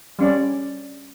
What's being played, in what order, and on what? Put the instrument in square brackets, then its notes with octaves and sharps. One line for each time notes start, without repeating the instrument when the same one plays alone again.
[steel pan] G3 C#4 D5